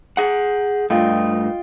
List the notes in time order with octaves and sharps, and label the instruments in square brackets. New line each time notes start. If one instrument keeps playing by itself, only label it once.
[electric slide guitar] G#4 F#5
[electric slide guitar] G2 A3 [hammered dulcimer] F4 D#5 G5